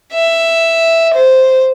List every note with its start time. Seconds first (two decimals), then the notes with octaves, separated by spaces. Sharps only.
0.14 E5
1.14 C5